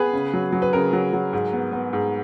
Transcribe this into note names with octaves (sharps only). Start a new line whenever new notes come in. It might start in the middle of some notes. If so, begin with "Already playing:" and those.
Already playing: B3 G#4 B4
C#3
F#3
F#3
B4
C#3 A#4
F#3
F#3
G#2
B3
B3
G#2